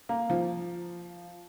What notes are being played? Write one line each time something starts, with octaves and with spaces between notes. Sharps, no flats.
A#3
F3